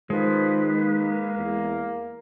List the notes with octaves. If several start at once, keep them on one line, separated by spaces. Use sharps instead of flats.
D#3 F3 G#3 B4
A#3
E2